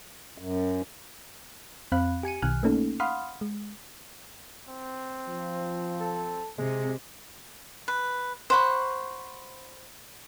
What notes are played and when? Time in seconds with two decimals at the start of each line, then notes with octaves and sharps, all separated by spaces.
0.38 F#2
1.92 F2 C4 F5 B5 F#6
2.23 G4 G#5 C#7 D#7
2.42 B1 B2 D#3 G#5 F6 F#6
2.63 A3 A#3 C#4 D#4 A4
3.00 F5 F#5 B5 C6 D#6 F6
3.41 G#3
4.69 C4
5.27 F3
6.00 A4
6.58 C3 G#3
7.88 B4
8.50 C5 F#5 B5 C#6